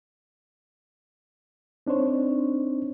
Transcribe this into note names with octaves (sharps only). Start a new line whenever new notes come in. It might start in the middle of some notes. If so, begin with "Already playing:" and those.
C4 D4 D#4 C5 C#5